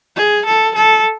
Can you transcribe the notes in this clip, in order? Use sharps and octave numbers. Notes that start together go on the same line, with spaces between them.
G#4
A4
A4